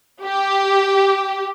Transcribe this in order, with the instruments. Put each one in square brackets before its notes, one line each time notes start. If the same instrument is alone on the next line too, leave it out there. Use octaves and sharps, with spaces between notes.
[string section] G4